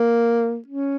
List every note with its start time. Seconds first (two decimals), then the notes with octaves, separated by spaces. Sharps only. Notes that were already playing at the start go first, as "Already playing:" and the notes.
Already playing: A#3
0.68 C#4